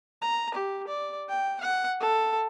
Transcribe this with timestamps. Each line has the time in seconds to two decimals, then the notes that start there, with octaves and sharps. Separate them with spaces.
0.22 A#5
0.54 G4
0.88 D5
1.28 G5
1.61 F#5
2.00 A4